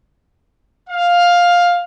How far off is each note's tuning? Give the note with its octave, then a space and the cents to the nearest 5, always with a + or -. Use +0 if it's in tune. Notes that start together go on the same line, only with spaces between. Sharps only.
F5 +10